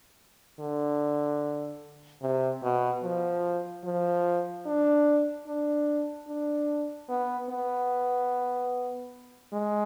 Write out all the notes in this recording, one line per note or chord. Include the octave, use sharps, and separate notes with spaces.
D3
C3
B2
F3
F3
D4
D4
D4
B3
B3
G#3